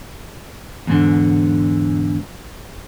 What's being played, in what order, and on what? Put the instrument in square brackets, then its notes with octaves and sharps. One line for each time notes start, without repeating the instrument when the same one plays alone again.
[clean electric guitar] E2 G#2 D3